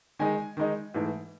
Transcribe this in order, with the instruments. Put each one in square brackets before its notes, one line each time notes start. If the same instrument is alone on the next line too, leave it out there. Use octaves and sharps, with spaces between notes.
[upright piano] D#3 G#3 D#4 G#5
D#3 G#3 D#4
G#2 E3 A3